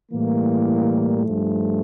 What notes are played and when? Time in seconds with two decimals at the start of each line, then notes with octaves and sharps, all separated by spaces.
0.11 A2 E3 G3 A#3
1.24 G2 F3 A3